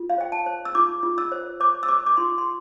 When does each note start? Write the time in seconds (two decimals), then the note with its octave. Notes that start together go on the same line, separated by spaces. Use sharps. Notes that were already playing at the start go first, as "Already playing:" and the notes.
Already playing: F4
0.10 F5
0.18 C5 G5
0.32 A5
0.46 C5
0.65 E6
0.75 F4 D6
1.03 F4
1.18 E6
1.32 C5
1.60 C5 D6
1.83 E6
1.88 C5 D6
2.06 D6
2.17 F4 C6
2.38 C6